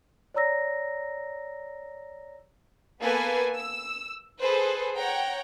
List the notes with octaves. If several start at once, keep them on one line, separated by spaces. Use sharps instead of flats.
C#5 D5 A#5 E6 A#6
A#3 B3 A4 B4 G#5
E6
G#4 A4 B4 C5
C#5 F#5 G5 A#5